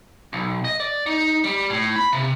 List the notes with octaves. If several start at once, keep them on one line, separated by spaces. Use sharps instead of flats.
B1
D#5
D5
D#4
G3
A2
B5
C3